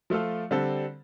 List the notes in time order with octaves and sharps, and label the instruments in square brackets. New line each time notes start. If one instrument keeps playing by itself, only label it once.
[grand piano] F3 A3 F4 A4
D3 G3 C4 A4